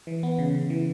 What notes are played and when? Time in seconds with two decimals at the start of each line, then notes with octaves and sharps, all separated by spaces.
0.07 E3
0.23 B3
0.38 C#3
0.55 C#3
0.70 E3